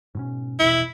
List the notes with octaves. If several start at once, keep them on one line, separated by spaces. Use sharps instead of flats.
G#2 B2 C#4
A#1 E2 B2 E4